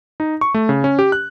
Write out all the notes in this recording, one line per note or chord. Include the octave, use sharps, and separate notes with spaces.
D#4
C#6
A3
C#3
C#4
G4
F#6